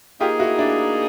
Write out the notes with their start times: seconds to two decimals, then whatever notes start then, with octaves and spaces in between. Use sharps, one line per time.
0.20 A#3 D#4 F4 G4 G#4
0.39 E4 F#4
0.58 D4 E4